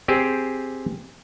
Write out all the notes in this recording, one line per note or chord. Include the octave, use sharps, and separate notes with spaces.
C4 G4 G#4 C5